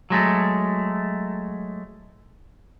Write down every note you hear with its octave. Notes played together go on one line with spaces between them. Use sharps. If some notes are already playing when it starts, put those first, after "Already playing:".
F#3 G#3 A3